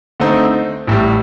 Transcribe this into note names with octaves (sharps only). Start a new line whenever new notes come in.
D3 A3 C4 D#4
A1 A2 G3